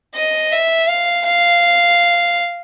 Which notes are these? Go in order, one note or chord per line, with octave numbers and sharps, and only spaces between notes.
D#5
E5
F5
F5